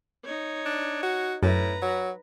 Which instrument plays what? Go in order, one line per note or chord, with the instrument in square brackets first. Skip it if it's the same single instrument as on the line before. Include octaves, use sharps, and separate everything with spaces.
[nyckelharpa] D#4 C#5
[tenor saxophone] D4
F#4
[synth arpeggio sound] F#2 [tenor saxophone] A2 [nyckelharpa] B4 A#5
[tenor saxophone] F#3